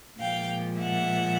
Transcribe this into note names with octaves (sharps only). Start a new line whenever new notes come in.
A#2 F3 G#3 F5 G5
E5 F#5